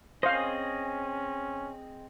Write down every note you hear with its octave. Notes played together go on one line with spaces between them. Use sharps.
C4 C#4 G#4 C5 D#5 F5